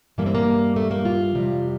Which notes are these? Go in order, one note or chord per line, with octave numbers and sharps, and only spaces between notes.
G2 E3 G3 A#3
C4
A#3
A3
A#3
F4
F2 C3 G3